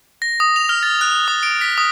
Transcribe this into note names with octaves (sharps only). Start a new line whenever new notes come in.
A#6
D#6
F7
F6
A6
F#6
D#6
D7
B6
D#6